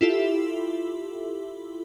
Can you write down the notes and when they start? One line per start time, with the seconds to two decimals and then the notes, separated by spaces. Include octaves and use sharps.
0.01 E4 F4 G4 A4 E5